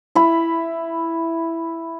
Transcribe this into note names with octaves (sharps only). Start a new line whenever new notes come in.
E4 B5